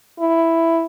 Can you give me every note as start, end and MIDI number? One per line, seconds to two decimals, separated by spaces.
0.19 0.86 64